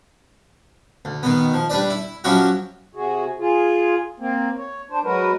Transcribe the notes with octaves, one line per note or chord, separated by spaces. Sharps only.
D2
B2 D#3 B3
F3
G3 D4 B4 D5
E4
F3 F#3 C#4 E4 F#4 G4
C3 F#4 G#4
F4 G#4
A#3 C4
C#5
D4 C5
F#3 G#3 F#4 A#4 B4